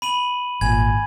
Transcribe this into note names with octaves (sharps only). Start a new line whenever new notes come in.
B5 D#7 F#7
G#1 A#2 G#5 G#6